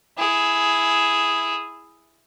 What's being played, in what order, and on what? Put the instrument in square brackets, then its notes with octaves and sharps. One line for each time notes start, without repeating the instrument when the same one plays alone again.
[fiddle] E4 G#4